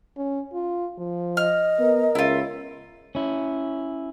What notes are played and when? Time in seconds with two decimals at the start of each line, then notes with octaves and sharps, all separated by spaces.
0.18 C#4
0.53 F4
0.98 F3
1.37 D#5 F6
1.79 B3 A#4
2.15 C#2 E4 F4
3.15 C#4 E4